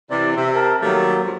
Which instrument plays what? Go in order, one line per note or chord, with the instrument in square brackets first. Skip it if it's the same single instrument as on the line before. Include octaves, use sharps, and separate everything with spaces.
[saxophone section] C3 E3 [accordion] D5
[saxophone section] C3 [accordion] E5
[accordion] A#4 A5
[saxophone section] D#3 G3 A3 [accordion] F#3 A#3
[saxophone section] G2 F3